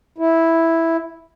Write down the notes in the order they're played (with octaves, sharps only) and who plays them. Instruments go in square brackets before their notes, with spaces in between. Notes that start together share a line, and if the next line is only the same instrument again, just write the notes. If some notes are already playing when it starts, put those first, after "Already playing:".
[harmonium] E4